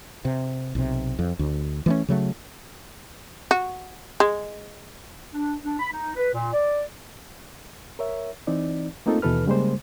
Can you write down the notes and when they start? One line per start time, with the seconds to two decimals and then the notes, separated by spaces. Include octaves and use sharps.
0.25 C3
0.75 B1 C3
1.19 F2
1.39 D2
1.86 E3 A3 C#4
2.08 C#3 F#3 A3
3.51 F#4
4.20 G#3
5.34 D4
5.63 D4
5.80 B5
5.92 D#4
6.17 B4
6.34 A#2
6.53 D5
7.99 A#4 C#5 E5
8.47 E3 C4 D#4 D5
9.06 A3 A#3 C4 D#4 F4 A4
9.22 D#2 B2 E3 A4 B4 F6
9.46 C#3 G3 G#3 A#3 C5